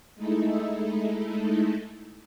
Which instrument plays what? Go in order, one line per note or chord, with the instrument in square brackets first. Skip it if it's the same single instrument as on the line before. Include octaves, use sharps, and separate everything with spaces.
[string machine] G#3 A3 D#4 E4 A4